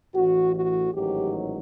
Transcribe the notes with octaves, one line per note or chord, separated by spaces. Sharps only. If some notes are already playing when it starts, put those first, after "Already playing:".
A1 A2 E3 F#4
F#4
A1 G#2 D#3 F#3 G4